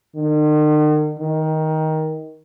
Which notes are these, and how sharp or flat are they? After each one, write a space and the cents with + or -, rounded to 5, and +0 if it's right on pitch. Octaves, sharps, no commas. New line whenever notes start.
D#3 -45
D#3 +15